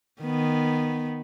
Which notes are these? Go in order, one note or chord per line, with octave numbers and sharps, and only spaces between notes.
D#3 B3